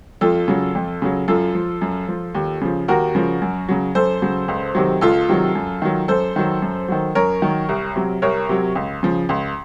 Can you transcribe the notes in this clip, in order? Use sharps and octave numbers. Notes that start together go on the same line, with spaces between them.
F2 F4 A4
C#3 F#3
F2
C#3 F#3
F#2 F4 A4
F3
F#2
F3
D#2
C#3 F3
D#2 F#4 A#4
C#3 F3
F#2
C#3 F#3
F#2 A4 C5
C#3 F#3
C#2
C3 D#3 F#3
C#2 F4 A4
C3 D#3 F#3
F#2
D#3 F#3
F#2 A4 C5
D#3 F#3
F#2
D#3 F#3
F#2 A#4 C#5
D#3 F#3
C2
C3 F#3
C2 A#4 C#5
C3 F#3
C#2
C#3 F3
C#2